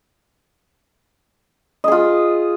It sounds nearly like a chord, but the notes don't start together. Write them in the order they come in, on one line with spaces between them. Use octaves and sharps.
D#5 G#4 F4